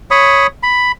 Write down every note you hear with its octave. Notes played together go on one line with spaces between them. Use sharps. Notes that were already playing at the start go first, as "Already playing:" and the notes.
C#5 B5 D#6
B5